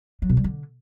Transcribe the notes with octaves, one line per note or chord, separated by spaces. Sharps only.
F#3
B2
G3
D3